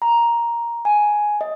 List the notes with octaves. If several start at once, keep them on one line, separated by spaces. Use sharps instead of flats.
A#5
G#5
D#5